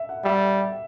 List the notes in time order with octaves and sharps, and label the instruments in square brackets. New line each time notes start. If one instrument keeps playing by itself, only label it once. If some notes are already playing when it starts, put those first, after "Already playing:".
Already playing: [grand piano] E5
F#5
[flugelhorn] G3 [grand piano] E5